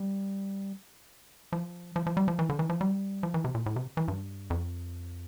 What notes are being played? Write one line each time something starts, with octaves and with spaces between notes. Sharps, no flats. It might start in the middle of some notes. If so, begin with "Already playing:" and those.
Already playing: G3
F3
F3
F3
G3
F3
E3
D3
E3
F3
G3
F3
E3
C3
A#2
A2
C3
E3
G2
F2